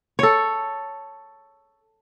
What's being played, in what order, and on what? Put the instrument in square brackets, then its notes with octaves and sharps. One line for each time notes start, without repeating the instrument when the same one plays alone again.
[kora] A4 C#5